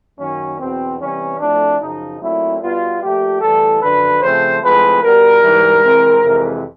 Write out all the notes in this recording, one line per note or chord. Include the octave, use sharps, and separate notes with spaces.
F#2 D#3 F#3 A#3 C#4
E2 B2 F#3 C4
C3 E3 G3 B3 C#4
A2 F3 A3 C4 D4
F#2 C#3 F3 D#4
A#2 F#3 A3 C4 E4
B2 G3 B3 F4
A#2 F3 A3 G4
A2 E3 G3 A4
F#2 D3 F3 B4
C#3 F3 A3 C4 C5
A2 F3 G#3 C4 B4
B2 G3 B3 A#4
G#2 E3 G3
C3 E3 G#3 C4
F2 C3 E3 G#3